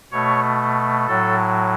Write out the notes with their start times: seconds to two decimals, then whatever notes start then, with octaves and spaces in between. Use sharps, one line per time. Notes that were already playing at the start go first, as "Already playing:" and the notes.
0.12 B2 A3 C#5
1.07 A2 F#3 A4